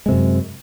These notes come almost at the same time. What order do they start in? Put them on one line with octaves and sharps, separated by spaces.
G#3 C3 F#2